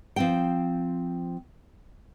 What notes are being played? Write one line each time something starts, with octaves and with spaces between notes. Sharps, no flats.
F3 C4 G5